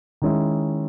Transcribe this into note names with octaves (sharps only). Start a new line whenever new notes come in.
D#3 G#3 C#4 E4